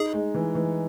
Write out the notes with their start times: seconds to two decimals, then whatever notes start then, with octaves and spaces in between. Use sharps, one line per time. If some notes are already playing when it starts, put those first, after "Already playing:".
Already playing: D#4 G#4
0.14 G#3
0.34 E3
0.55 E3